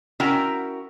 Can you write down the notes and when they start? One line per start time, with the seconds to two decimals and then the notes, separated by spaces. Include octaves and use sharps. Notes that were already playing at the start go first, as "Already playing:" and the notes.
0.20 C#4 E4 F#4 A#4 G5 A#5